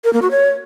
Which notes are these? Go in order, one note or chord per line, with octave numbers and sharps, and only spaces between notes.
A#4
A#3
F#4
C#5